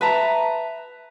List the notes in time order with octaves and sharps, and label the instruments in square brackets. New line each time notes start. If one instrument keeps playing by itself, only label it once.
[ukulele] B4 E5 A5 A#5